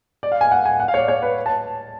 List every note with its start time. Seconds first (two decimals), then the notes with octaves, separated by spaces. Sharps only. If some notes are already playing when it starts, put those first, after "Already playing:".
0.23 D5
0.32 F5
0.41 G#5
0.52 F#5
0.65 G#5
0.80 F#5
0.88 F5
0.94 C#5
0.98 D5
1.08 C#5
1.22 B4
1.46 A5